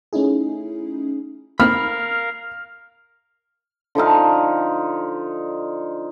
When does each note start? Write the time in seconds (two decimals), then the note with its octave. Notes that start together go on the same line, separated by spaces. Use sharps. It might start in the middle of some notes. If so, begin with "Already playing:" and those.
0.13 A3 C#4 D#4 E4 G#4
1.60 A#3 C4 D#4 A#4 F5 B5 F6
3.95 D3 F3 D#4 F5